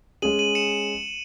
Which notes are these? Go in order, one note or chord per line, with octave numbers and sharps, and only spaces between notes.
G#3 C#4 G#4 D#7 F#7
D#7 F#7
C#7 E7